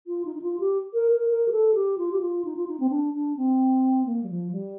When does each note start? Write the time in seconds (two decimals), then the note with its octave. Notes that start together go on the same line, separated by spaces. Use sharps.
0.07 F4
0.25 D#4
0.35 D#4
0.42 F4
0.59 G4
0.93 A#4
1.11 A#4
1.29 A#4
1.48 G4
1.52 A4
1.74 G4
1.98 F4
2.12 G4
2.20 F4
2.44 D#4
2.56 F4
2.67 D#4
2.79 C4
2.90 D4
3.13 D4
3.36 C4
4.05 A#3
4.23 G3
4.29 F3
4.51 G3